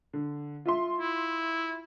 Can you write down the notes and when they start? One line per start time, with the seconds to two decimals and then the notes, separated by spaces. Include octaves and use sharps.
0.13 D3
0.65 F4 E5 C6
1.00 E4